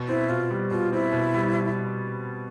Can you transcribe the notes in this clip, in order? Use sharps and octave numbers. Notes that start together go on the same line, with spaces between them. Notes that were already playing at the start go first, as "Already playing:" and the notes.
Already playing: B2
C4 E4
B2 F4
G3
B2 F4
C4 E4
B2
G3